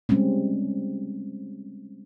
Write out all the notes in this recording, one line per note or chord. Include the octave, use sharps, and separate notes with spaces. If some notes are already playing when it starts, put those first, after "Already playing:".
G3 G#3 C4 C#4